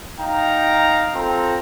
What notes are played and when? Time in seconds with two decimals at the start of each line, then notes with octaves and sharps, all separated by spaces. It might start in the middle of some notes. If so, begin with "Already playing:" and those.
0.20 D#4 F5 G5 A#5
1.14 C4 F4 A4 A#5